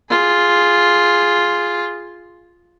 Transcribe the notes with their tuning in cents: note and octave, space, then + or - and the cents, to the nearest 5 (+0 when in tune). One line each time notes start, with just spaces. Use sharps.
F4 +0 G#4 -5